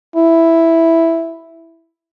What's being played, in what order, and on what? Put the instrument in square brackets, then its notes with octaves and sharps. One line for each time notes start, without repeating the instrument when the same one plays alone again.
[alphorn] E4